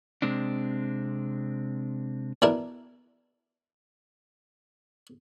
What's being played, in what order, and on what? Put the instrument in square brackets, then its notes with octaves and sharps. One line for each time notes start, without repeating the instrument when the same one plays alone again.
[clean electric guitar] C3 G#3 C4 D4
[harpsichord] B2 D4 E4 A#4